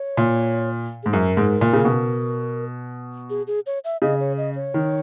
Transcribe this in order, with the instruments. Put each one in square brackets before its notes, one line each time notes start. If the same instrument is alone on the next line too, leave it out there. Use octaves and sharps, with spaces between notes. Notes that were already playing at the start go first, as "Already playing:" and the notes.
Already playing: [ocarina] C#5
[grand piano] A#2
[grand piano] G#2 [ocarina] G#4
[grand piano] F#2 [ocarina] A#4
[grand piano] G#2
A#2
C#3
B2
[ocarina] G#4
G#4
C#5
E5
[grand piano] C#3 [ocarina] D#5
[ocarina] C#5
D#5
C#5
[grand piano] D#3